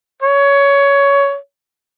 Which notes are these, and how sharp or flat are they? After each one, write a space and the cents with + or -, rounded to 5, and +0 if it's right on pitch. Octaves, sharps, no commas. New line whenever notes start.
C#5 +15